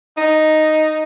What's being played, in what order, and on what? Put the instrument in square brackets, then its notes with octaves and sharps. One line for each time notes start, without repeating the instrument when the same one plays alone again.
[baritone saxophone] D#4